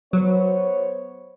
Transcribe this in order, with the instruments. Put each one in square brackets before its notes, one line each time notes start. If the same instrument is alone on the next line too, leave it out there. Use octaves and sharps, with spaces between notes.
[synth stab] F#3 [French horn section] B3 C5 C#5